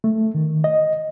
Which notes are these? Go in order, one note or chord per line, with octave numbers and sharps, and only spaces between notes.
A3
D#3
D#5